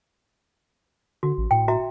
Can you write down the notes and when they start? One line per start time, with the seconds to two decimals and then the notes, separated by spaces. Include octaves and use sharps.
1.23 D3 F#4
1.38 A1
1.51 A2 G5
1.68 F#4 E5 A#5